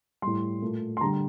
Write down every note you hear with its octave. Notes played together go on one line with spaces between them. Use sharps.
A2 G3 C6
A#2 A3
C6
D3 G3 A#5